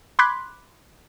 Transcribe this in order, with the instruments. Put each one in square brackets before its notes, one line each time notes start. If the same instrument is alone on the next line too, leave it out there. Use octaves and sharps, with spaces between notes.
[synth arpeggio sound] B5 C6 D6 F#6 G#6 B6